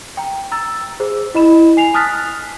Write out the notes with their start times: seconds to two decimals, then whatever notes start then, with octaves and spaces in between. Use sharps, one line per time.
0.17 G5 A#5
0.52 A#5 E6 A6
1.00 G#4 C5
1.34 E4 D#5 B5 E7
1.77 G#5 C7 F7
1.94 A5 D#6 F6 F#6 A6 B6